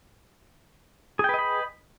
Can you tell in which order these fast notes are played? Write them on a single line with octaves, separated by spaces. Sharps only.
G#4 G5 B4 D#5 B5